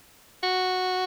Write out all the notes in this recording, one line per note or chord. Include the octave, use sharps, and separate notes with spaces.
F#4